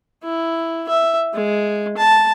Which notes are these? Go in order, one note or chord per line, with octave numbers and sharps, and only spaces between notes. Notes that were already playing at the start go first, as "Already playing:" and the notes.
E4
E5
G#3
A5